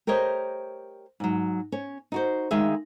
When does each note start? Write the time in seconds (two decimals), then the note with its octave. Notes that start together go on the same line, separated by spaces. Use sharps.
0.07 G4 A#4 C5 C#5 D#5
1.20 G#2 F#3
1.72 C#4 C#5
2.12 D#4 F#4 C5
2.51 D2 D#3 G#3 G#4 E5 F5